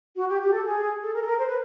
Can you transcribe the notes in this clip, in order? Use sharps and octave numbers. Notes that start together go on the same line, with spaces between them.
F#4
G4
G4
A4
G#4
A4
A#4
A4
A#4
C5
B4